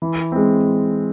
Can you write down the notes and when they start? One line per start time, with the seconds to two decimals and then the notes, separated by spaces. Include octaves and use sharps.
0.02 E3
0.32 G#3 C4